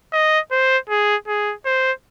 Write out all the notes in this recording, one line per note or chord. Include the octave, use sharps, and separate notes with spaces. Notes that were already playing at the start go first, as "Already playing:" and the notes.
D#5
C5
G#4
G#4
C5